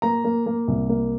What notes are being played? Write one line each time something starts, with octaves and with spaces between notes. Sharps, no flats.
A#3 A#5
A#3
A#3
C2
A#3